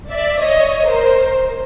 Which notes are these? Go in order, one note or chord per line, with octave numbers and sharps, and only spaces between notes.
D5 E5
C#5 D#5
A#4 C5